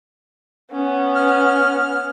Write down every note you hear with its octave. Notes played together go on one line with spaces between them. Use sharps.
B3 C#4
F6